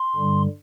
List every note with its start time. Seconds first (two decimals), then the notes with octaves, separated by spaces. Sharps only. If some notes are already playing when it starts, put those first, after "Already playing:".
Already playing: C6
0.15 G2 D3 G3